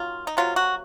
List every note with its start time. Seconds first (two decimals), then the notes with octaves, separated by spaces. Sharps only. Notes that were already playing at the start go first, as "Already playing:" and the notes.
Already playing: D#3 F#3 A#3 F4
0.27 D#4
0.37 C3 F#3 A#3 F4
0.56 F#4